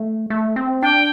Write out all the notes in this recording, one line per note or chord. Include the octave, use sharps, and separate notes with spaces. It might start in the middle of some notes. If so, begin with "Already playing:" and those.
Already playing: A3
A3
C4
D4 G5